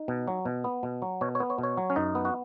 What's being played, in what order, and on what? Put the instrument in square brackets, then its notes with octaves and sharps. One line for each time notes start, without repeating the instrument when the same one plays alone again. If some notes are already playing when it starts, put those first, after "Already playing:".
Already playing: [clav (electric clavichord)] D#4
B2
F#3
B2
B3
B2
F#3
B2 C#5
C#5
B3
C#5
B2
C#5
F#3
C#4
F#2 D#4
B3
F#4